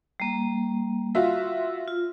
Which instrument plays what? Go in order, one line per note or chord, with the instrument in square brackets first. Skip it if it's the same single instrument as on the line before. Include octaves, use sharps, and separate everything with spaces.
[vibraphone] G3 A#3
[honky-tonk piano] F4 F#4 E5 [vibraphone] C6
[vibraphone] F4